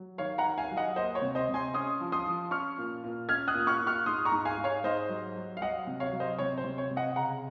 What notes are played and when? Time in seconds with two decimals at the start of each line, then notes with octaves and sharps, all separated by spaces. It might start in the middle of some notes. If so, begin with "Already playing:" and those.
Already playing: F#3
0.18 D#3 C#5 F5
0.38 F#5 A#5
0.45 D#3
0.58 F5 G#5
0.71 F#3
0.77 D#5 F#5
0.96 A#3 C5 D#5
1.15 C#5
1.22 C3
1.35 C5 D#5
1.49 C3
1.54 G#5 C6
1.74 C#4 C6 D#6
2.00 F3
2.12 C6 D#6
2.26 F3
2.51 C#4 C#6 F6
2.78 A#2
3.04 A#2
3.29 C#4 F6 G#6
3.48 D#6 F#6
3.54 A#2
3.67 C#6 F6
3.80 A#2
3.87 C#6 F6
4.06 G#2 C6 D#6
4.25 A#5 C#6
4.32 G#2
4.45 F5 G#5
4.58 G#2
4.64 C#5 F5
4.84 G#2 C5 D#5
5.09 F#3
5.36 F#3
5.57 F5
5.61 F#3 D#5 F#5
5.87 C3
6.00 C#5 F5
6.12 F#3
6.20 C5 D#5
6.39 C3 C#5
6.58 C5
6.64 C3
6.78 C#5
6.91 C3
6.96 D#5 F#5
7.16 C#3 F#5 A#5